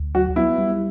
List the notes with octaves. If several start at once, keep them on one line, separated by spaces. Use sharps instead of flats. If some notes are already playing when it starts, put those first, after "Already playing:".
Already playing: D2
F#3 F#4
B3 E4
G3